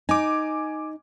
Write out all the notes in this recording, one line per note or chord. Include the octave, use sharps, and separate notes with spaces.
D#4 G#5 D6